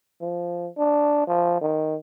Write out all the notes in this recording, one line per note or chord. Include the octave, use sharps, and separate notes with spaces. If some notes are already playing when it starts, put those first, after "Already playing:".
F3
D4
F3
D#3